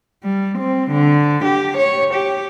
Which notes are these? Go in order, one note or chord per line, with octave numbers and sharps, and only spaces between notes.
G3
C4
D3
G4
C#5
G4